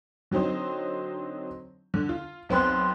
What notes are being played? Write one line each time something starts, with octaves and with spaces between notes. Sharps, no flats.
D3 F#3 C4 D#4 C5
D3
F4
B1 B3 C4 C6 F#6